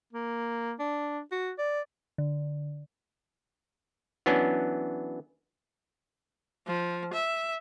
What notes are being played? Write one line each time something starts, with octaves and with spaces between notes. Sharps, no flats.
A#3
D4
F#4
D5
D3
E3 F#3 B3 C#4 D4
F3
E5